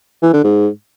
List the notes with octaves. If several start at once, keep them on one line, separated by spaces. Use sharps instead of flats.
E3
D3
G#2